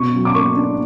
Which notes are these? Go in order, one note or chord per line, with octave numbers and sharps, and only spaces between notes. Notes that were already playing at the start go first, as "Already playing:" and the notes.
Already playing: B2 C#6
F#3
D6
A#3 C#6
D4